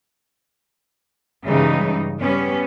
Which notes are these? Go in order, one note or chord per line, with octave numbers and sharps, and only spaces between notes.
G2 C#3 E3 G3 G#3 D#4
G3 B3 C#4